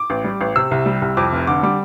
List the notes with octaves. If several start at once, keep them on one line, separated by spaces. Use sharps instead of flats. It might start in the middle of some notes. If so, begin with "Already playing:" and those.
Already playing: D6
A1
G3
A1
C3 E6
C2
G3
C2
F2 D6
F1
D3 D6
G3 D6